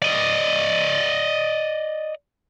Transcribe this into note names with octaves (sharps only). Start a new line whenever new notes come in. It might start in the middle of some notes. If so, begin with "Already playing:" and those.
D5 D#5